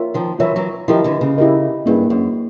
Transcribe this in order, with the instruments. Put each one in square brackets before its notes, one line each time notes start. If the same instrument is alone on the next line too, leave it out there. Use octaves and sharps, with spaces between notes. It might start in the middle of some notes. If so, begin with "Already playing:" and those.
Already playing: [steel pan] F4 A#4 C#5 E5
[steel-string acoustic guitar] D#3 F3
[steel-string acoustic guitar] E3 F#3 [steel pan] F4 A#4 C#5 E5
[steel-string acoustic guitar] E3 F#3
[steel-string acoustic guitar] D#3 F3 [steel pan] E4 G4 A#4 D#5
[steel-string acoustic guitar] D3 E3
C#3
[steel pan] E4 G4 A#4 D#5
[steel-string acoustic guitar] G2 [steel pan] A#3 C#4 E4 G#4 B4
[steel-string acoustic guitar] F#2